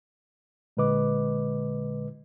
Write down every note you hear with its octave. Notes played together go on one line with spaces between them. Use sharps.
A#2 D3 G#3 B4 D#5 D6